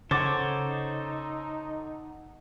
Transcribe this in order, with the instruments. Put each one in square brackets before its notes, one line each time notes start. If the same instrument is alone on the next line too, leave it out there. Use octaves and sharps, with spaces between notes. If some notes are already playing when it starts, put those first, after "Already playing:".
[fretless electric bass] C#3 [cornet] D#4 [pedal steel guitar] A4 C5 C#5 [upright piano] F#5 D6 A6